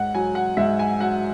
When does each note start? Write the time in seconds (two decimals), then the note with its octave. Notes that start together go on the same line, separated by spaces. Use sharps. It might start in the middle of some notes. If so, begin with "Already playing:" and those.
Already playing: G#2 F#5
0.14 F#3 G#5
0.35 F#5
0.57 G#2 E5
0.79 G#5
1.01 F#3 F#5